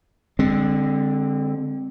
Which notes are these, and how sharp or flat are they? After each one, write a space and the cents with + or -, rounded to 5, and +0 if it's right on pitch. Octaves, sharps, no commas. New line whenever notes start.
D3 +0 G#3 -40 C4 +0